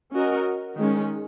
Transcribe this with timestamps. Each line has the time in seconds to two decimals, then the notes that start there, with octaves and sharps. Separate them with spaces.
0.14 C#4 F#4 A#4 D#5
0.77 D#3 G#3 C#4